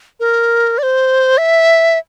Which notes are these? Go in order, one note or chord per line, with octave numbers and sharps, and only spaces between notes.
A#4
D5
C5
E5